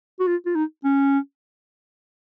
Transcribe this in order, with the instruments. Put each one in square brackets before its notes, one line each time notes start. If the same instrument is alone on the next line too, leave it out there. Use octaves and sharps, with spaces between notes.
[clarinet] F#4
F4
F4
D#4
C#4